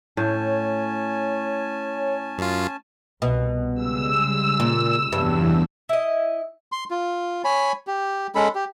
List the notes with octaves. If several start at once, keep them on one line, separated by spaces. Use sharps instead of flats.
A2 C#4 C#5 G#5 A5
F#2 F4
C2 B2
C#3 G3 G#3 E6
A#2
F1 E2 G2 F#3
E4 D#5
C6
F4
C#5 G#5 B5
G4
G#3 C#4 A4 B5
G4